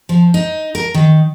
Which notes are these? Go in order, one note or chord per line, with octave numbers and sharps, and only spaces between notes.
F3
D#4
A#4
D#3